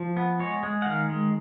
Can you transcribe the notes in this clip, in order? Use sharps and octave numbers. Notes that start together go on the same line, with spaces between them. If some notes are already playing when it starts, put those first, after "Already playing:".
Already playing: F3
B3
G#3 C#5
G#3
F#5
D#3 F5
G#3